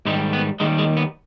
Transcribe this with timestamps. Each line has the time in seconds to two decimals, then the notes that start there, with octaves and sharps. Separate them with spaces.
0.05 G#2 D#3 G3 G#3
0.33 B3
0.60 D#2 D#3 G3 G#3
0.78 G#3
0.97 B3